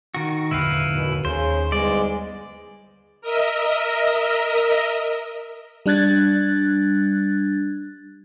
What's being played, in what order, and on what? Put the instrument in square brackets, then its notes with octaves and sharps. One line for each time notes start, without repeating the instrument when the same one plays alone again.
[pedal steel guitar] D#3 F#4
[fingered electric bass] G#1 E2 D3 [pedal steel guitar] E4 B4 F5
[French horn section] F#2 B2
[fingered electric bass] D#2 [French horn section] C#3 [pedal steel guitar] C5
[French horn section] G#2 E3 G#3 [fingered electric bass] G3 B3 [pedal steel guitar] D5
[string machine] A#4 D#5 E5
[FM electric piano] G3 D4 F#6 G#6 A6